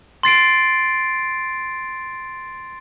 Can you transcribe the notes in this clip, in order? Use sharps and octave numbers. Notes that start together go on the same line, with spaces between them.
C6 A6 C7 D7